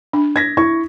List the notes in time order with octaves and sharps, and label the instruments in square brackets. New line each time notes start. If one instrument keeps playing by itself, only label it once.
[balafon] D4
[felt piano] G#6 A#6 B6
E4 C#6 G#6